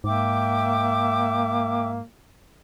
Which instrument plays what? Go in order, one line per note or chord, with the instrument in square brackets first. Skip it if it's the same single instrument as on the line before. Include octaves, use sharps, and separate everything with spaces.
[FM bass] G#2 [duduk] A#3 [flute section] E5 G5 D6